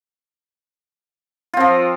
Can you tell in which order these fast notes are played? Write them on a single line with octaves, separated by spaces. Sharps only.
F4 C4 F3